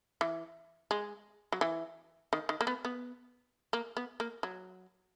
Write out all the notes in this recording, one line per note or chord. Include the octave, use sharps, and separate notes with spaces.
E3
G#3
F#3
E3
D#3
D#3
A#3
B3
B3
A#3
B3
A#3
F#3